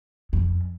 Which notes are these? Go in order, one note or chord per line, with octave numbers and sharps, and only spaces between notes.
F2